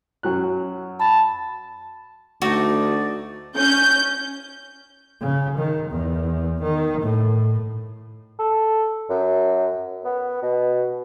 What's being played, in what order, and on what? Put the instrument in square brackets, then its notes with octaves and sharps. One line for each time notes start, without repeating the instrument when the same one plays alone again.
[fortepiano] F#2 F#3 F#6
[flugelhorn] A5 [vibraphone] B5
[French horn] D2 [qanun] A3 D#4 [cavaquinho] F#4 [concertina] D5
[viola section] C#4 [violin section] G6
[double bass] C#3
D#3
E2
D#3
A2
[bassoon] A4
F#2
B3
B2